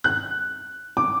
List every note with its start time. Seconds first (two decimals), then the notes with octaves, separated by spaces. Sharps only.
0.04 F#6
0.97 D6